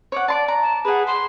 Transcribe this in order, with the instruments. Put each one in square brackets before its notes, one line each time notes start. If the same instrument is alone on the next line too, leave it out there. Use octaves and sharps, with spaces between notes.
[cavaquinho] C#5 D5 F#5
[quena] D5 [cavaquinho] A5 C6 D6
[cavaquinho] A#5
[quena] A5
[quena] G#4 [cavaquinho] B4 F#5
[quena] C6